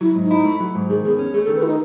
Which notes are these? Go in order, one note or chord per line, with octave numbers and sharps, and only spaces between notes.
F#3 E4
G#2
D#4
E4
A3
F#3
G#2
D#3 G#4
E2 G#4
C#4
A3 G#4
A4
D#3
B4
E4
D#4